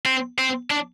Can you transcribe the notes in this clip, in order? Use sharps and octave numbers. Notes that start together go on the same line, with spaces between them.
C4
C4
D4